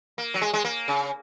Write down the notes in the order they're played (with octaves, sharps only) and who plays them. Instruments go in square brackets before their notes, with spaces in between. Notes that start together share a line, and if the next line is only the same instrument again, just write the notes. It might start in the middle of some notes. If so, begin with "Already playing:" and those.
[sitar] A#3
F#3
G#3
G#3
A#3
C#3